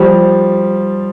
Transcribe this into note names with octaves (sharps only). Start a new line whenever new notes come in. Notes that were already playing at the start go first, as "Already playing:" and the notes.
Already playing: F3 G3